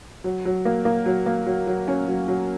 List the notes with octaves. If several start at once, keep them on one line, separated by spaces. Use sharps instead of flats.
F#3
F#3
A#3
A#3
F#3
A#3
F#3
F#3
C#4
F#3
F#3